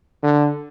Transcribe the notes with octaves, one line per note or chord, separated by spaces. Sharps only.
D3